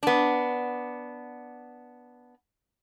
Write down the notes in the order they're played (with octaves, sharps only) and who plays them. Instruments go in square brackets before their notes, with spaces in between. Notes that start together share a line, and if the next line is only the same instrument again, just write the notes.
[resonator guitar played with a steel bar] B3 D4